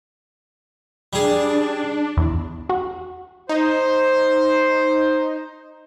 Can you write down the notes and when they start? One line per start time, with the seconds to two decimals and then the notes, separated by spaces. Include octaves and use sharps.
1.13 G3 D4 G#4
2.17 E2
2.69 F#4
3.49 D#4 C5